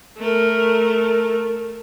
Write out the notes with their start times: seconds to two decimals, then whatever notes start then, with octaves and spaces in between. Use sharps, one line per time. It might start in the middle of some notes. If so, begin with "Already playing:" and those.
0.19 A3 A#4